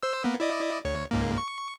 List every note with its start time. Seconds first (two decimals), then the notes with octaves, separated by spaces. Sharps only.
0.03 C5 E6
0.24 A#3 B3
0.40 E4 D5 D#5
0.85 D2 C#5
1.11 C#2 G#2 A#3
1.38 C#6